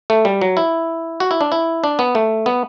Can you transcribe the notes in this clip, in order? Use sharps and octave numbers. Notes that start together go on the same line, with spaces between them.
A3
G3
F#3
E4
F#4
E4
D4
E4
D4
B3
A3
B3